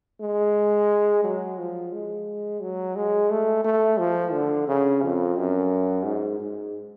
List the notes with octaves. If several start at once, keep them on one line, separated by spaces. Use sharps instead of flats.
G#3
F#3
F3
G#3
F#3
G#3
A3
A3
F3
D3
C#3
F2
F#2
G#2
G#2